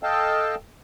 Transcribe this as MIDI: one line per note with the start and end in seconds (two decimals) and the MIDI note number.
0.03 0.55 69
0.03 0.55 75
0.03 0.55 77
0.03 0.55 79
0.03 0.55 81